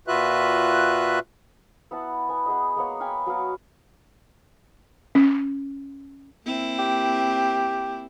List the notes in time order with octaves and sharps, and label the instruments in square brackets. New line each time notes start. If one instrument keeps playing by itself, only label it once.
[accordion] A#2 F4 F#4 B4 E5 F#6
[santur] B3 E4 F#5 A5
B3 G#5
B3 G#4 D#5
G#3 A#3 B3 C#5
F5 G5 G#5 B5
F#3 B3 F#4 F5
[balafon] C#4
[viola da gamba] A#3 C4 E4
[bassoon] G4